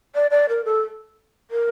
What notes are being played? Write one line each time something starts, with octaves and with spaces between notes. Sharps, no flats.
D5
D5
A#4
A4
A#4